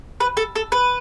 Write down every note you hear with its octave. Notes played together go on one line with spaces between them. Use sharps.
B4
A4
A4
B4